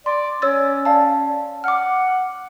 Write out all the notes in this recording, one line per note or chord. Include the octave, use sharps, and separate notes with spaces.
D5 C6
C#4 C#5 E6 A6
D5 F5 A5
F#5 D6 F6